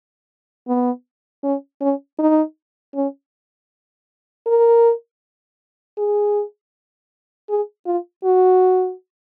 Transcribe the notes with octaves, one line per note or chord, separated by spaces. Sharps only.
B3
C#4
C#4
D#4
C#4
A#4
G#4
G#4
F4
F#4